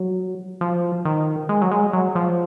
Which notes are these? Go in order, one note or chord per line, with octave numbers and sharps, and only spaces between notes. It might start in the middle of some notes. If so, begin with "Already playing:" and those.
Already playing: F#3
F3
D#3
G#3
F#3
G#3
F#3
F3